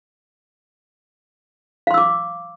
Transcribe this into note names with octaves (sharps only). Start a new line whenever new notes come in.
F5 C6 D6 E6